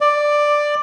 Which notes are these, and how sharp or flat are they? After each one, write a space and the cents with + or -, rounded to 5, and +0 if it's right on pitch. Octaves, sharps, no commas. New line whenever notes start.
D5 +10